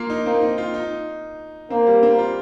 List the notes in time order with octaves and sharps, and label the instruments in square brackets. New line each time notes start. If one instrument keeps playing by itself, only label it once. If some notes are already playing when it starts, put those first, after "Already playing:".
Already playing: [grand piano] A#3 F4
D#4
[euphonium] A#3 [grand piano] C4
[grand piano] D#4
F4
D#4
[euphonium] A#3 [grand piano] C4
[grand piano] G3
C4
F4